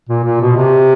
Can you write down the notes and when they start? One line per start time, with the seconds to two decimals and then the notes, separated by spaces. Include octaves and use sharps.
0.09 A#2
0.24 A#2
0.41 B2
0.57 C3